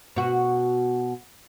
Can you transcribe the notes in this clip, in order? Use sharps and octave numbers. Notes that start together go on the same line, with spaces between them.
B2 F#4